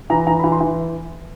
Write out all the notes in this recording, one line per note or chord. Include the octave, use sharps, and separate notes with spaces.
E3 A#5
E3 A#5
B5
E3
C6
E3